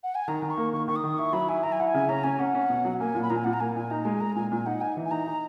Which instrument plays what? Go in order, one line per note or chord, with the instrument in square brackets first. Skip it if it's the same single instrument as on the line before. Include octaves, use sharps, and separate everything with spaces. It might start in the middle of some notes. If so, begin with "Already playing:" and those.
[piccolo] F#5
G#5
[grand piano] D#3 [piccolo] A#5
[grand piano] D#3
[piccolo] C#6
[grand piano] A#3
[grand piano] D#3 [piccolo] C#6
[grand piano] D#3 [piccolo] C#6
[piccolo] D#6
[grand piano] D#3
[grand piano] E4 [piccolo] C#6
[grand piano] F#3 [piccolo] B5
[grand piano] E4 [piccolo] G#5
[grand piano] E4 [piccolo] A#5
[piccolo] G#5
[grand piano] E4 [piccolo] F#5
[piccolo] G#5
[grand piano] C#3
[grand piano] C#4 [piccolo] A#5
[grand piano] C#4 [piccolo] G#5
[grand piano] C#4 [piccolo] F#5
[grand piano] C#4
B2
F#3
[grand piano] A#3 [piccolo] G#5
[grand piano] A#2
[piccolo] B5
[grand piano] A#2 [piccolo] A#5
[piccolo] G#5
[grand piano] A#2 [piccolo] F#5
[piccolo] A#5
[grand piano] A#3 [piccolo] G#5
[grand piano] A#2 [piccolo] G#5
[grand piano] D#4 [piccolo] A#5
[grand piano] G#3 [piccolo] G#5
[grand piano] G#3 [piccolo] A#5
[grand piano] A#2 [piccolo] G#5
[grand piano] A#2 [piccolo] G#5
[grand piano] D#4 [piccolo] F#5
[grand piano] D#4 [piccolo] G#5
[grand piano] E3
[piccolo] G#5
[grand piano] D#4 [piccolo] A#5
[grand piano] D#4